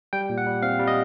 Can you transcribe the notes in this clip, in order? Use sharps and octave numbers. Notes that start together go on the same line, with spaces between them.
G3 G5
A#2
F#5
G3
C4 F5
G3
D#5